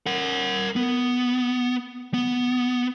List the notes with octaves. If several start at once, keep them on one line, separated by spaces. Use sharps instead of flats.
A#4 F#5
B3
B3